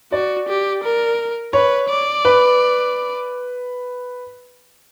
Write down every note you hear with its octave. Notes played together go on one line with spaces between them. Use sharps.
F#4 D5
G4
A#4
B4 C#5
D5
B4